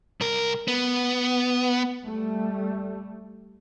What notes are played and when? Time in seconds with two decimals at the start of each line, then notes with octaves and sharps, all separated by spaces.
0.21 C2 A#4
0.68 B3
2.06 G3 A3